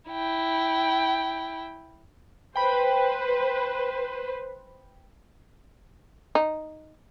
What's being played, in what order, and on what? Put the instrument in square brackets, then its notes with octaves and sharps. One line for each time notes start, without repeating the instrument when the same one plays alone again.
[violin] E4 G5
[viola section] B4 C5 [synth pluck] G5 B5
[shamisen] D#4